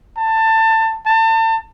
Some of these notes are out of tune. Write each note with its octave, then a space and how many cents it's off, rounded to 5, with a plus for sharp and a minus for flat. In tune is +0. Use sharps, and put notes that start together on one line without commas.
A5 +20
A5 +35